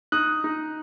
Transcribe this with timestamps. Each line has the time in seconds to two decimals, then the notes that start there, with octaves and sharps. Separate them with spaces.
0.12 D#4 D#6 F#6
0.44 D#4